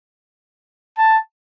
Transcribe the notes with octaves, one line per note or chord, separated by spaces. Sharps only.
A5